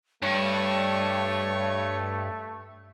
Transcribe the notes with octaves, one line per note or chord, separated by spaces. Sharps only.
G2 A3 C#5